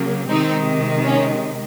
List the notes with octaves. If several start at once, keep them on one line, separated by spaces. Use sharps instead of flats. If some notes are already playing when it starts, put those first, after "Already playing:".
Already playing: C#3 F#3 A#3
C3 D#3 G#3 C4 D#4
C#4